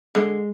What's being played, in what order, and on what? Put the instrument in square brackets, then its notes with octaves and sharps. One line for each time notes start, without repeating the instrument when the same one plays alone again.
[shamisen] D3 [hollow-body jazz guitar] G#3